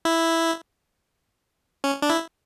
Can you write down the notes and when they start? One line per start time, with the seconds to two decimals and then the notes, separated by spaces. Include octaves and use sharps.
0.05 E4
1.84 C#4
2.02 D4
2.10 E4